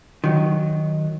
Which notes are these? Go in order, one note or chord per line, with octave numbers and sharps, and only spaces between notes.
D#3 F#3